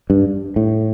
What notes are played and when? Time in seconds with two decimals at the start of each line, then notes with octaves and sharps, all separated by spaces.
0.10 G2
0.56 A2